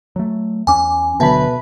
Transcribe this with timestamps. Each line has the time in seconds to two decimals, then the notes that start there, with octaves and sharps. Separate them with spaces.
0.16 F#3 A3
0.67 E2 C#4 G#5 D6
1.20 D1 B2 D3 F#3 B4 E5 A5 B5